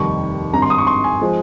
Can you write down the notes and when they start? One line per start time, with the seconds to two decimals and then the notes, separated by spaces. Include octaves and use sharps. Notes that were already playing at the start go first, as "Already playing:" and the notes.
Already playing: F1 D#2 D#3 G3 C#6
0.53 G#1 G2 D#3 A#5
0.62 C6
0.70 D#6
0.78 C#6
0.87 C6
1.04 G#5
1.21 F3 G#3